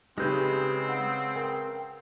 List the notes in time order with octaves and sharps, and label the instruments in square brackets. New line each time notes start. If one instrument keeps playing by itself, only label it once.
[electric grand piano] C#3 B4 A#6 [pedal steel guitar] G#3 G6 [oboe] C4 [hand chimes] D#4 G4
[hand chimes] F#5 E6
[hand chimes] A#4 [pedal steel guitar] G5